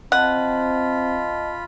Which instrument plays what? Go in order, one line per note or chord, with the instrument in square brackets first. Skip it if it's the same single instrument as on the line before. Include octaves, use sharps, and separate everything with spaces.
[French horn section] C4 [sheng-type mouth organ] F4 B5 [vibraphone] D#5 A5 [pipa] F#5